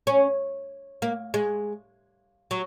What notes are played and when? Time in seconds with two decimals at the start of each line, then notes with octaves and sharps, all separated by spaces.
0.07 C#4
1.02 A#3
1.34 G#3
2.51 F#3